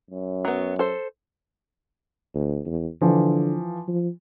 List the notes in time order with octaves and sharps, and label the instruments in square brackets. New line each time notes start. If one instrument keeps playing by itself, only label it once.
[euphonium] F#2
[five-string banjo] F#3 B3
A4 C5
[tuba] D2
E2
[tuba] D3 [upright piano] E3 F3
[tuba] F3